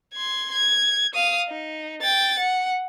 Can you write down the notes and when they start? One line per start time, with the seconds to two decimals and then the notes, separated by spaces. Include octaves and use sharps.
0.14 C6 G#6
0.52 G#6
1.14 F5 D#6
1.48 D#4
2.02 G5 A6
2.39 F#5